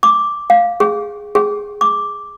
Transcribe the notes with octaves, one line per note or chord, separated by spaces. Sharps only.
D6
F5
G#4
G#4
D6